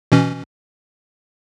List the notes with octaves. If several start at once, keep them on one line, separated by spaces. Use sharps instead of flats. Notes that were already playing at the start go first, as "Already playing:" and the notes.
B2 E3 C#4